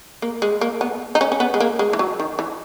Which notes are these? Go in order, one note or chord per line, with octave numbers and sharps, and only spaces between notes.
A#3
G#3
A#3
B3
D#4
C#4
C#4
B3
G#3
A#3
G#3
E3
F#3
D#3
E3